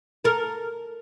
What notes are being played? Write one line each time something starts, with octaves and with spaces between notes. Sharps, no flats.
A4 A#4